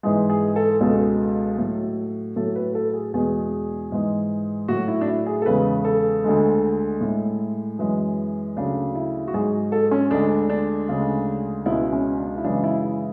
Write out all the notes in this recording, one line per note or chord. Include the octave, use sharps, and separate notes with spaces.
G#2 E3 G#3 G#4
G#4
A4
C#2 B2 G#3 A4
A2 F#3
A2 F#3 A4
B4
A4
G#4
E2 B2 G#3 G#4
G#2 E3 G#3
A2 F#3 F#4
E4
D4
E4
G#4
A4
E2 C#3 E3 G#3 B4
A4
D2 D3 G#3
A2 G#3 E4
F#2 E3 G#3
D2 C#3 F#3 D4
E4
F#4
G#2 F#3 G#4
A4
C#4
D2 D3 G#3 D4
D4
D2 C#3 G#3
C#2 B2 G#3 E4
C#4
D4
E4
F#2 C#3 E3 G#3 D4
E4
E4